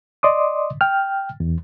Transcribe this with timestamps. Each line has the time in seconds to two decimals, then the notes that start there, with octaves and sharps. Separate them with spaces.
0.23 D5 D#5 C6 D6 D#6
0.81 G5 F6
1.40 E2